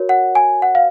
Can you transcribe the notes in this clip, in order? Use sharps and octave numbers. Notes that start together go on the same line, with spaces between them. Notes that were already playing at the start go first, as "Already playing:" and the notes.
Already playing: F#4 A#4 C#5
F#5
G#5
F#5
F5